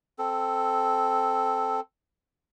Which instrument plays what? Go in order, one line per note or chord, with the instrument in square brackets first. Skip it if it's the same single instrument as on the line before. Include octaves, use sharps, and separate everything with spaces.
[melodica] C4 A4